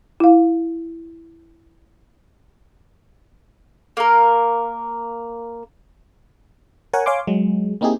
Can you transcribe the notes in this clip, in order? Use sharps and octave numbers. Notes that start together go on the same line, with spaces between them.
E4 F5
A#3 A#4
A#4 C#5 F#5 G#5
C#5 F5 G#5 C6 D6
F#3 G#3
A#3 C4 D#4 E4 G4 G#4